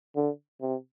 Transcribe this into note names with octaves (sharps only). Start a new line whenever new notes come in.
D3
C3